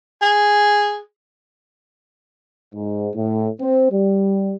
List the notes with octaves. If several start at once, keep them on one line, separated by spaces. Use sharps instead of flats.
G#4
G#2
A2
C4
G3